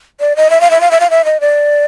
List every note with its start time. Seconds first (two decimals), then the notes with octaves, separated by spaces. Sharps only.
0.20 D5
0.36 D#5
0.50 E5
0.61 F5
0.71 E5
0.81 F5
0.91 E5
1.00 F5
1.10 E5
1.25 D#5
1.41 D5